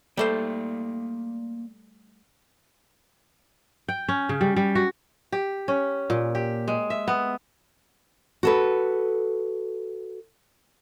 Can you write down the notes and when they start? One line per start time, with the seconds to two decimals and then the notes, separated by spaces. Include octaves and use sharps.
0.17 G3 A3 A#3 C5 D5 G5
3.89 G5
4.09 C#4
4.29 C#3
4.41 G3
4.57 G3
4.75 F#4
5.32 G4
5.68 C#4
6.10 A#2
6.35 G4
6.68 G#3
6.90 E5
7.08 B3
8.43 F#4 A4 B4